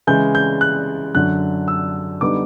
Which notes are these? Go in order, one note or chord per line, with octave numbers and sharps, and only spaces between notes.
C#3 E3 G#3 G6
G6
F#6
F#2 D3 F#3 F#6
E6
D3 G3 B3 D#4 D6